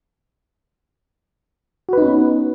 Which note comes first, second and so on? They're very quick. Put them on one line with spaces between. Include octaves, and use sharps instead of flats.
F#4 B4 D#4 C#4 B3